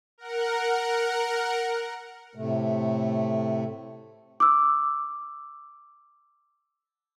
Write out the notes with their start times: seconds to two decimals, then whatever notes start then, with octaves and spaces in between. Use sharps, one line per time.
0.18 A#4 F#5
2.35 A2 C3 A3
4.40 D6 E6